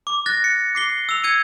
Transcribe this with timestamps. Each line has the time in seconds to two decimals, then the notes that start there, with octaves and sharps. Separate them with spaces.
0.07 D6
0.26 F#6 A6 A#6
0.44 C#7
0.75 D6 C7 G7
1.09 E6 F7
1.24 E6 G#6 C#7 D#7